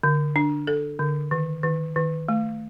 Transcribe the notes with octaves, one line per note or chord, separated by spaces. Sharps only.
D3
D4
A4
D3
D#3
D#3
D#3
A3